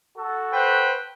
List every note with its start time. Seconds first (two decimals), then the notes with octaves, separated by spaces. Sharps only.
0.17 F#4 A4
0.53 B4 C5 G5